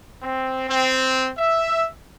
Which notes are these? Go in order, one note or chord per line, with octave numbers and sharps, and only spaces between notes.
C4
C4
E5